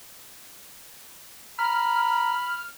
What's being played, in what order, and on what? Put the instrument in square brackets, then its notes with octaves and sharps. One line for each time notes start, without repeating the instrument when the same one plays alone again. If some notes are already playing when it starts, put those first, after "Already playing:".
[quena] A#5 [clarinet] B5 [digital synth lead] F6